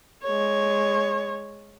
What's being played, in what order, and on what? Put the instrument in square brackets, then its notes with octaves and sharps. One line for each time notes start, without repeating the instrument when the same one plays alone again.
[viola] G#3 C#5